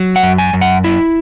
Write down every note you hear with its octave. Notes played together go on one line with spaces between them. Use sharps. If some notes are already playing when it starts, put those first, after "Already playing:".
Already playing: F#3
F#5
F#2
G#5
F#2
F#5
E4